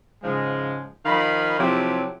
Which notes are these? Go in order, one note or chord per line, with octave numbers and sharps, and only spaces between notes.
G#2 C#3 F3 G#3
D#3 F3 D#5 F5 B5
C3 F3 F#3 E4 G4 A4